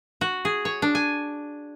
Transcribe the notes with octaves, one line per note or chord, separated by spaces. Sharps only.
F#4
G#4
C#5
D4
G#5